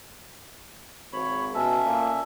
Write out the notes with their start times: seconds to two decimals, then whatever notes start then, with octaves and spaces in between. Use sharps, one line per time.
1.13 G#1 C#5 B5
1.54 B2 C#4 A4 E5
1.85 A#2